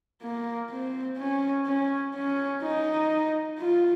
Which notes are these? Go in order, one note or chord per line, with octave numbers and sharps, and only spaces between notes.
A#3
C4
C#4
C#4
C#4
D#4
F4